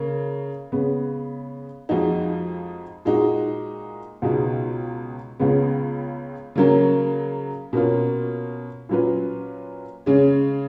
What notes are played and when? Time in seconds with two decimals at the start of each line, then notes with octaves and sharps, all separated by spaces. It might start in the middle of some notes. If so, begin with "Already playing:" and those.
Already playing: C#3 A#3
0.72 C#3 G#3 B3
1.89 F2 F3 G#3 D#4 F#4
3.05 A#2 G#3 D#4 F#4
4.22 C#2 B2 G#3 D#4
5.39 C#2 C#3 G#3 B3
6.56 C#3 F#3 A#3 C#4
7.73 B2 A#3 C#4 F4
8.89 A#2 F#3 C#4 F4 B4
10.06 C#3 G#3 C#4